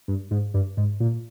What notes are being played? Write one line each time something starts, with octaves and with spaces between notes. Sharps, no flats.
G2
G#2
G2
G#2
A#2